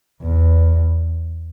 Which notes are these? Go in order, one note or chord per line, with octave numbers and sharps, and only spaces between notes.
E2